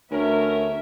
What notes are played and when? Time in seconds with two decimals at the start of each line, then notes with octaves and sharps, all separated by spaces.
0.11 D2 B3 C#4 A#4 E5